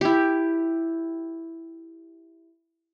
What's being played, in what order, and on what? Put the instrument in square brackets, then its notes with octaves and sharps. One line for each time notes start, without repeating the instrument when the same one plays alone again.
[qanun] E4 G4